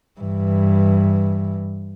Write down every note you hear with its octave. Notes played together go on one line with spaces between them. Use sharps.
G2 E3